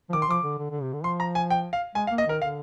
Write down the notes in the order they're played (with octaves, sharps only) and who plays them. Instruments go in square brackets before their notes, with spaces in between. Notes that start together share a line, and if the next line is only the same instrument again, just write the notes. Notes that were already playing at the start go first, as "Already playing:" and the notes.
[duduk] F3
[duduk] D#3 [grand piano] D6
[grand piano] C6
[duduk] F3 [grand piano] D6
[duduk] D3
D3
D3
C3
D3
[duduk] F3 [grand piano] C6
[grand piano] A#5
G#5
G5
F5
[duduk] G#3 [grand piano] G#5
[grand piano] F5
[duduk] A#3
[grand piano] D#5
[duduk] D#3 [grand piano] A#4
[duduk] D3 [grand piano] F5